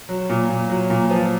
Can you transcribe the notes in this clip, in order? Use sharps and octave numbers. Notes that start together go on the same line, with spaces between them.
F#3
A#2
A#2
F#3
A#2
F3